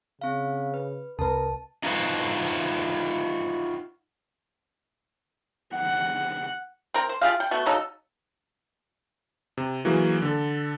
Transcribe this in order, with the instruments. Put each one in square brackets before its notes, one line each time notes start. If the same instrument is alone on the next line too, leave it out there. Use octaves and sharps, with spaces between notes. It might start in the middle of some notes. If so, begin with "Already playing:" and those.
[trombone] C#3 [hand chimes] C4 F5
[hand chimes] B4
[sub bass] C2 [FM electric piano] C3 B4 [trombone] A#4 [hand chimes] A5
[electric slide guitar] D#4 F4 F#4 B4 C5
[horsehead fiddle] F#5
[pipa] C4 A#4
C5
F4 G4 G#4 F5
G5
A3 B3 F#4
C#3 F#3 D#4 A4
[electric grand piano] C3
E3 F#3 A#3 F#4 G#4 A#4
D3 A4